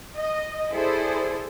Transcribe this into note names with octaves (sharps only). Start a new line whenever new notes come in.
D#5
E4 G#4 A4 C5 D5